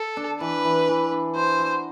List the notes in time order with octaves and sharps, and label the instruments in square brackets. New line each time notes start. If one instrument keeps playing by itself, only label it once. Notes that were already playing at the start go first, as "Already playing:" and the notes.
Already playing: [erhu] A4
[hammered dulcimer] D4
[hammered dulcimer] E3 [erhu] B4
[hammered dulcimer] E3
E3
D4
[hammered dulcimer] F#4 [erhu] C5
[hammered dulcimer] F#4